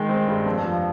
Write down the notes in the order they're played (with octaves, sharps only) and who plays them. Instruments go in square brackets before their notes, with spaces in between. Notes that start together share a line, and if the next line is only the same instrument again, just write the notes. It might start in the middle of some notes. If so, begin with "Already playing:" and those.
Already playing: [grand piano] D#3 G#3 G5
C4
G2
F2
F3